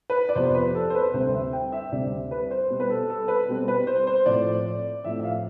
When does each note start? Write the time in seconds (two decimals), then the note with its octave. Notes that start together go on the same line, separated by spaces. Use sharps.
0.10 B4
0.29 D5
0.35 F2 C3 F3 B3 C5
0.55 B4
0.75 A4
0.90 C5
0.95 B4
1.14 D2 C3 G3 C4 C5
1.34 E5
1.53 G5
1.72 E5
1.92 D2 C3 G3 C4 D5
2.31 B4
2.51 C5
2.70 B2 G3 C4
2.80 B4
2.90 A4
3.10 A4
3.28 B4
3.48 B2 G3 C4
3.68 B4
3.87 C5
4.07 C5
4.26 A2 F3 A3 C4 D5
5.04 A2 F3 A3 C4 E5
5.20 E5
5.24 F5